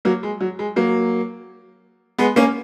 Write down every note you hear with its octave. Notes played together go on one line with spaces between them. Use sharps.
F#3 A#3
G#3
F#3
G#3
F#3 A#3
G#3 B3
A#3 C#4